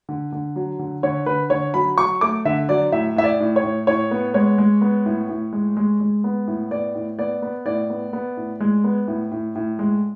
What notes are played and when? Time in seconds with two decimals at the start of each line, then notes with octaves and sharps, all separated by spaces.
0.09 D3
0.32 D3
0.56 F#3
0.79 D3
1.03 D3 C#5
1.26 D3 B4
1.50 D3 C#5
1.74 F#3 B5
1.98 F#3 C#6
2.21 A3 D6
2.45 D3 E5
2.69 F#3 D5
2.92 A2 E5
3.16 A2 E5
3.24 D5
3.40 A2
3.56 C#5
3.63 A2
3.87 A2 C#5
4.11 B3
4.34 G#3 C#5
4.58 G#3
4.81 B3
5.06 A2
5.29 A2
5.53 G#3
5.77 G#3
6.00 G#3
6.24 B3
6.47 A2
6.71 B3 D5
6.95 A2
7.19 B3 D5
7.42 B3
7.66 A2 D5
7.90 B3
8.13 B3
8.37 A2
8.60 G#3
8.84 B3
9.08 A2
9.31 A2
9.55 A2
9.79 G#3